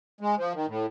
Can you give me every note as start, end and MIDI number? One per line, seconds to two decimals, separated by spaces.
0.21 0.35 56
0.37 0.53 53
0.54 0.66 51
0.67 0.86 45